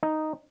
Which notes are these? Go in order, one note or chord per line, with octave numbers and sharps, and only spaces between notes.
D#4